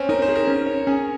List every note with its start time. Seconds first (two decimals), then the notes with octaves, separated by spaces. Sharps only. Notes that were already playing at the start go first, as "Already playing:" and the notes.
Already playing: C4 C#4
0.09 D#4 A#4
0.22 C5
0.29 G#4
0.35 A#4
0.47 C#4
0.67 C#5
0.87 C#4 G#4